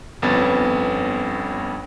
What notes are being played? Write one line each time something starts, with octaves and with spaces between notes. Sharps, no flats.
G1 F2 B3 C#4 A6